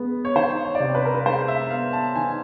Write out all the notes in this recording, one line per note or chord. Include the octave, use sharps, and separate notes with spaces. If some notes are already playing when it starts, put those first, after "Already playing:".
Already playing: G#3 B3
C#5
D#3 C5
C#5
D5
C3 C#5
B4
A#4
B4
G#3 C5
E5
B3 F5
A5
D#3 G#5